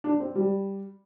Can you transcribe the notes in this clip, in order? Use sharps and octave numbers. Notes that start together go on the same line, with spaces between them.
D4
C4
G3